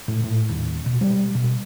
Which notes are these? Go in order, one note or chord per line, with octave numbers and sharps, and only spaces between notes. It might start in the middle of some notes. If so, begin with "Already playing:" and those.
A2
A2
D#1
B2
G3
B2